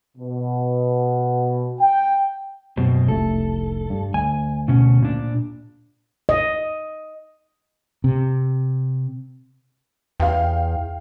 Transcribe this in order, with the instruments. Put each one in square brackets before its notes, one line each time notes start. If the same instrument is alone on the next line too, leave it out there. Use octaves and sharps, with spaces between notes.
[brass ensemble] B2
G5
[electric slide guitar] F#2 B2 C4
[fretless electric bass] F1 C2 A3 [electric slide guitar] A4
[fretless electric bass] G2
[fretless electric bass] D2 [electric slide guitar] G#5
[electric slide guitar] B2 C#4
A#2 D4
[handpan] D#5
[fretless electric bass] C3
[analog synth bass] E2 [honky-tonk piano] F5 G5